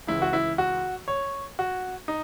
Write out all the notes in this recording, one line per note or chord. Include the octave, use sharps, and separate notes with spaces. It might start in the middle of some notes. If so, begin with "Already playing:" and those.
C#2 C#3 E3 E4
F#4
E4
F#4
C#5
F#4
D#4